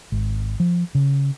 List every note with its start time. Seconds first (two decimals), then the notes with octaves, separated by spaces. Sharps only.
0.12 G#1
0.60 F3
0.95 C#3